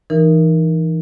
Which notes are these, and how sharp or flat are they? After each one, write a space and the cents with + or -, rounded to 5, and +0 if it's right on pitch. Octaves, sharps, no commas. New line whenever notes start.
E3 +0 D#4 -20 A#4 +10